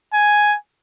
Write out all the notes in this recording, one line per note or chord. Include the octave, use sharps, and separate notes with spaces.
G#5